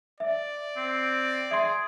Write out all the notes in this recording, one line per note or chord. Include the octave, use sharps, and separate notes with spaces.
D5 E5
C4
G#4 E5 C6